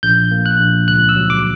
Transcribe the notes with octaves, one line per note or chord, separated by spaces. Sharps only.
A#1 G6
A#3
F#6
A#1
C#2 F#6
E6
F#3
D6